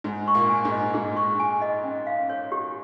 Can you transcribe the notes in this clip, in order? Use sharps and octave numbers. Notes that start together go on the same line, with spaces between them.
G#2 G#3 G#4
C#6
A#2 A#3
G#5
G#2 G#3
D#5
G#2 G#3 G#4
C#6
G#5
D#5
C#4
F5
C#5
G4